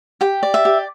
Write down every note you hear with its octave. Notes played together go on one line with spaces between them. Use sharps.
G4 G5
D5
E5
G4